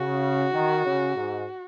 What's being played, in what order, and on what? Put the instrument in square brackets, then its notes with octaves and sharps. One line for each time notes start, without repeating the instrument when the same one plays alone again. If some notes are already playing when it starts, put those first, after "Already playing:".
Already playing: [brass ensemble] C#3 [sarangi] F#4
[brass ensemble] D#3
C#3
G#2